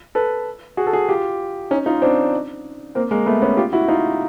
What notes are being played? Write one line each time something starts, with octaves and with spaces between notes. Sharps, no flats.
A4 B4
F#4 G#4
A4
F#4 G#4
F4 G4
C#4 D#4
D#4 F4
C4 D4
A#3 C4
G#3 A#3
A3 B3
B3 C#4
F4 G4
E4 F#4
D#4 F4